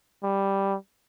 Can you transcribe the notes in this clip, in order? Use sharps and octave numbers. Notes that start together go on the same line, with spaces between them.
G3